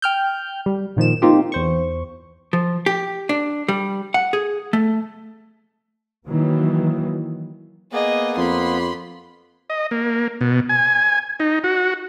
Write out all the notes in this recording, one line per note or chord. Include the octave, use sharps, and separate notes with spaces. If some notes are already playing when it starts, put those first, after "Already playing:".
G5 F6 G6
G3
A#2 D#3 F3 E7
A#3 C4 D#4 F4 G4
E2 C5 C#6
F3
G4
D4
G3
F#5
G#4
A3
D#3 E3 F#3 A#3
A#3 B3 G#4 D#5
F2 B5 C6
D#5
A#3
B2
G#5
D#4
F#4